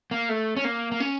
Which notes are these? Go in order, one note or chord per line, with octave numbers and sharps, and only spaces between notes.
A#3
A3
C#4
A#3
A#3
C#4